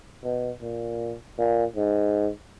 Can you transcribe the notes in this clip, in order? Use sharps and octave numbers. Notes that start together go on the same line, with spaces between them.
B2
A#2
A#2
G#2